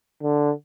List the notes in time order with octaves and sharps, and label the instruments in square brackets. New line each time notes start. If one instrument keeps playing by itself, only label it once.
[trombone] D3